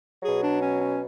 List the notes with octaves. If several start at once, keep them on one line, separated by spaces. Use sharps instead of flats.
B2 F#3 G#4
D4
C#4
C#4